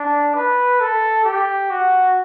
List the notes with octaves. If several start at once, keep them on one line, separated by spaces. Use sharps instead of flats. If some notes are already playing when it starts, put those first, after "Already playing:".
Already playing: D4
B4
A4
G4
F#4